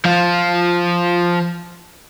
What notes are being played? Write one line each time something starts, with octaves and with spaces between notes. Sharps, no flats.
F3 F4